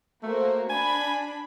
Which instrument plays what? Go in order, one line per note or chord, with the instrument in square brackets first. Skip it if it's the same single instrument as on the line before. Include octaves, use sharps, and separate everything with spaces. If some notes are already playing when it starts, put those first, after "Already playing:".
[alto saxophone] A3 [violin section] A#3 F#4 C5
[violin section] D4 B5 [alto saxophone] G#5